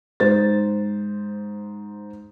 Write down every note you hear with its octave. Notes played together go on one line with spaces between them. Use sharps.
G#2 C5 A6